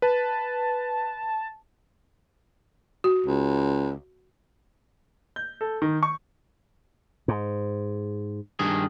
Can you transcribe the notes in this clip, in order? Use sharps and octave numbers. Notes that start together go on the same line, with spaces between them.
B4 A5
F#4
C#2
G6
A4
D#3
C#6
G#2
G2 D#3 G#4